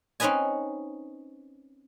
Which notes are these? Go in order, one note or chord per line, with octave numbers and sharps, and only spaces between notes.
C4 C#4 D#4 B4 D#5 G#5